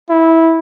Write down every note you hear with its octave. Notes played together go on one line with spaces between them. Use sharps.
E4